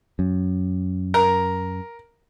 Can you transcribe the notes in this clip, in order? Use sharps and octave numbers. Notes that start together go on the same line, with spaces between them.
F#2
A#4